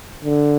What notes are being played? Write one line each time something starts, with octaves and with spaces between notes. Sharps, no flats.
D3